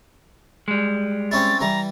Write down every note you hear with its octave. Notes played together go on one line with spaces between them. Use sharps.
G3 G#3
C4 C#4 E4 A6
E3 G3 A#5